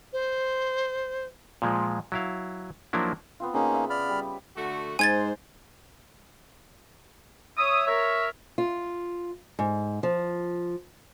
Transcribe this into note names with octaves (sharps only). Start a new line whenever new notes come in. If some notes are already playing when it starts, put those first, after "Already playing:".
C5
A#2 F3 G#3
F#3 E4 F5
F3 F#3 A#3 D4 E4
B3 C4 F4
C#3 A#3 C#4 D#4
E5 F#5
D5 B5 F6
G3
D3 A3 F#4
G#2 C5 G#5 G#6 A6
C#5 E5 D#6
A#4 C#5 E5
F4
G#2
F3